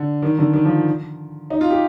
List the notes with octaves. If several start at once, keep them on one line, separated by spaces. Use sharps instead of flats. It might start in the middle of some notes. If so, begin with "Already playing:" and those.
Already playing: D3
D#3
D3
D#3
F3
D#4
F4
G4